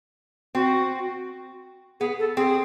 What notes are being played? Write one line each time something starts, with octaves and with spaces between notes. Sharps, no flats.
C4 F#4
B3 G#4
A4
C4 G#4
G#4